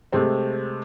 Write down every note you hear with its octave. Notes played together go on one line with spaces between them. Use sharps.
C3 G#3 A3 C4